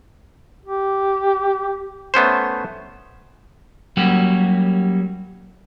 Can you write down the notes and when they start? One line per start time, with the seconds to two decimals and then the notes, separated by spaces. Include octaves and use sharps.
0.66 G4
2.14 A3 B3 C#4 C5
3.97 F#3 G3 A#3 C#4 F#4 G4